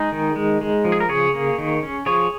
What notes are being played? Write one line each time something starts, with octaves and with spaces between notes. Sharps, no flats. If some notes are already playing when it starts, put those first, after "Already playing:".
Already playing: G#3 D#4 G#4
D#3
G#3
G#3
F3
G#4
A#4
C#3 G#4 C#5
A#3
D#3
C#4
F3 G#4 C#5